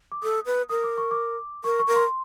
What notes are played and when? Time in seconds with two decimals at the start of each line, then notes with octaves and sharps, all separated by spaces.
0.12 D6
0.22 A4 D#6
0.46 B4
0.70 A#4 D#6
0.84 D6
0.98 C#6
1.11 D6
1.64 A#4 C#6
1.79 C#6
1.87 A#4
1.96 C6